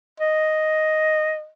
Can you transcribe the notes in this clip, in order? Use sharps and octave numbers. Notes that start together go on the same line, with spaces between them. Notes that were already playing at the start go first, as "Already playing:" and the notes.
D#5